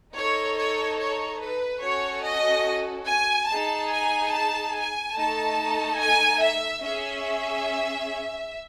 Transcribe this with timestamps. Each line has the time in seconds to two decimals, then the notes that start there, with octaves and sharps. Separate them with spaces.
0.14 D#4 A4 C#5
0.57 C#5
0.98 C#5
1.40 B4
1.82 C#4 F#4 A4 C#5
2.24 D#5
3.06 G#5
3.49 D#4 G#4 A5
3.91 G#5
4.31 A5
4.73 G#5
5.15 A3 D#4 A4 A5
5.98 G#5
6.40 E5
6.82 C#4 G#4 E5